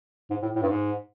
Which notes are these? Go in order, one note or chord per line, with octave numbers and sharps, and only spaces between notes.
G#2
A2
A2
G2
G#2